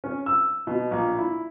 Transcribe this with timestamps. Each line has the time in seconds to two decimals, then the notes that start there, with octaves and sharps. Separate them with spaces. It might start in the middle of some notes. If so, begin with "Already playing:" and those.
0.04 C#4
0.26 E6
0.67 B2
0.91 A#1
1.18 E4